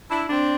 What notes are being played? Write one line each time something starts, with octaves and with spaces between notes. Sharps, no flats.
D4 E4
C4 D4